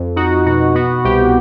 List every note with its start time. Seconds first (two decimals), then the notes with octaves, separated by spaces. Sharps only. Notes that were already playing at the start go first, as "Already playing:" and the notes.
Already playing: F2
0.16 D#4 F#4
0.46 B2 F#4
0.75 B3 F#4
1.04 C2 G4